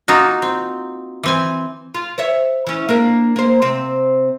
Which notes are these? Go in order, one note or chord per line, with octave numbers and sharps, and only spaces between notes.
A#3 D#4 F4 F#4
C4
E3 C4 G#5
F4
C5 C#5 E5
E3 C#4
A#3 D4 A#4
A#3 C5
C3 C4